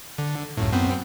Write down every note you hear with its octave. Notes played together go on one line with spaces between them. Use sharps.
D3
C#2 F#2 A2
F#2 B3 C4